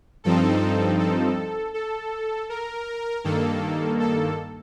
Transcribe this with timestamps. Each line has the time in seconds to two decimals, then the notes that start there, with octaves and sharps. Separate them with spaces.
0.24 G2 F3 C4 D#4 A4
0.99 A4
1.74 A4
2.49 A#4
3.24 G2 D#3 A#3 A4
4.00 A4